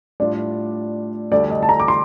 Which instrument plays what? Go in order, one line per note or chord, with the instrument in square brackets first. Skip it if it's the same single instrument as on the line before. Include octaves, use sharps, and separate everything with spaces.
[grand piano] A2 G3 D4 F4 [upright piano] D5
[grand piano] D2 D3 G3 D4 A4 [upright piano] D5
[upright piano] D#5
A5
A#5
D6
C6